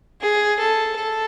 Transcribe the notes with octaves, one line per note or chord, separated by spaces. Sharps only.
G#4
A4
A4